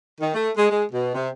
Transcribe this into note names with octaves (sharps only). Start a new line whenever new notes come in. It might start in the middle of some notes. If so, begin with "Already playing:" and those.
D#3
A3
G#3
G#3
B2
C3